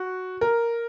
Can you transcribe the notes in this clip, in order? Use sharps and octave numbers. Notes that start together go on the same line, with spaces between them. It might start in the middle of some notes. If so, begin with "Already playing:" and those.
Already playing: F#4
A#4